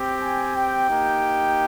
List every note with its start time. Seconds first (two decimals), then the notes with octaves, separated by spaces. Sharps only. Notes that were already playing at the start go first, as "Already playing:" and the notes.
Already playing: C4 G4
0.21 G#5
0.55 G5
0.89 A#3 D#4 G4